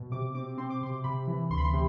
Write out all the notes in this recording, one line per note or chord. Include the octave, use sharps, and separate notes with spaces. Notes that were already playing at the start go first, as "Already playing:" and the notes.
Already playing: B2
C3 D6
C4 D6
C4 C6
D6
C3 C6
C3 B5
E3
D2 C6
B5
C6
C3